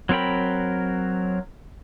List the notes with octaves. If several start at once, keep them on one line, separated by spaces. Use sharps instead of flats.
F#3 C4 A#4 G5 B5